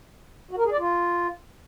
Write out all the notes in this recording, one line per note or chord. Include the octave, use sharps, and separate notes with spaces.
F#4
A#4
G#4
D5
F4